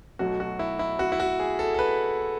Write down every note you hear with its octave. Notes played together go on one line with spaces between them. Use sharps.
B1 B2 F#3 A3 F#4
F#4
E4
E4
F#4
E4
F#4
G#4
A4
A4
B4